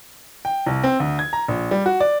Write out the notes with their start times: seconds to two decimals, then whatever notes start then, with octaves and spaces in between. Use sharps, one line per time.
0.45 G5
0.66 C2
0.84 C4
1.00 D2
1.19 G#6
1.33 A#5
1.48 A#1
1.71 G3
1.86 F#4
2.00 D5